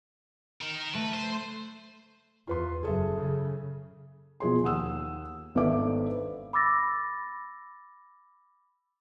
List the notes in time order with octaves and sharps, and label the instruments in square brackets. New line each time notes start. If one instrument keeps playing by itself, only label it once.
[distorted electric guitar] D#4 A#4
[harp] A3 [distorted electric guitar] B4
[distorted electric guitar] C5
[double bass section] E2 [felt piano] F4 B4 C6
[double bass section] F#1 F#2 [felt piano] G#4 A4 E5
[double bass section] C#3
[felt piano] B2 F3 G#4 C6
D#2 F#5 D#6 E6
G#1 B3 D4 A4 E5 D6
[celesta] B5 D6 E6 A6 A#6